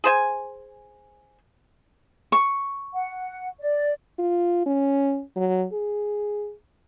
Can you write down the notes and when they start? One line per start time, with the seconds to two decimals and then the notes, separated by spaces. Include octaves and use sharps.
0.04 G#4 C5 G#5
2.32 C#6
2.94 F#5
3.61 D5
4.19 F4
4.66 C#4
5.36 F#3
5.73 G#4